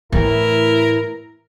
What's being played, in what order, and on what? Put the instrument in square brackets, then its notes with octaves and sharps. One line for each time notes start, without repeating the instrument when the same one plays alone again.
[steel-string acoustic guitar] A2 E3 [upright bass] A3 [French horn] E4 [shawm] A#4